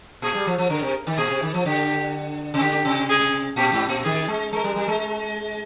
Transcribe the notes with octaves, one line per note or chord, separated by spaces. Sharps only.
A#2 G#4
G3
F3
F3
D3 A#4
C3
D#3
A#2 G#4
C3
D#3
F3
D3 G4
C3
D3 G4
C3
G#4
A#2 G4
G#2
A#2
D#3 G#4
G#3
G#3 A#4
G3
G3
G#3